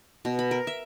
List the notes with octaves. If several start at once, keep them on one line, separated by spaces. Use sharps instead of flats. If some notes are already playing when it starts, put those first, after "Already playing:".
B2
B5
A#4
E5